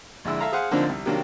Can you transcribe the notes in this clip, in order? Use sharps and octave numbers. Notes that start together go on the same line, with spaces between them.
A#1 D3 G#3 E4 E6
A4 E5 F5 A#5
G#4 C5 F5 F#5
D3 F3 A#3 C4 D4 D#4
C2
C3 D#3 F#3 A#3 D4